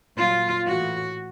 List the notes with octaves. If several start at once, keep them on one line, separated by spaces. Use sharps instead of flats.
A#2 F#3 F4
A2 E3 F#4